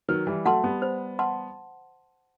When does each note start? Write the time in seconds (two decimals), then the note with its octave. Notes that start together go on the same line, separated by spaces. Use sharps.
0.08 D#3 F#3 B4
0.27 E3 G3
0.45 F#3 A3 F#5 A5 C6
0.64 G3 B3
0.82 C5
1.19 F#5 A5 C6